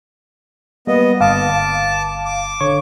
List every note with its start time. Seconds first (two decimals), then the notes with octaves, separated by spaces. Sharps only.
0.87 G3 A#3 B3 D#5
1.21 G1 F5 A5 D6
2.25 D6
2.61 D3 C#5 C#6